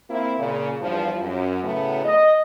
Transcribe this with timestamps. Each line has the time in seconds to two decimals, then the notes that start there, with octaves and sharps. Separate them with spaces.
0.10 A#3 C4 E4
0.39 A#2 C#3
0.81 E2 G2 F3
1.20 F#2
1.64 A2 C#3 F#3 A3 B3
2.05 D#5